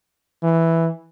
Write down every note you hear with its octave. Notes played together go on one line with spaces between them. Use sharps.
E3